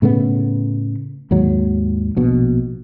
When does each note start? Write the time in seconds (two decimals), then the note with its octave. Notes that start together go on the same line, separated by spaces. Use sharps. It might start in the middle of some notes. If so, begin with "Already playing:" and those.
0.02 A2 C#3 A3 B3
1.31 D#2 G#2 F#3
2.16 A#1 B2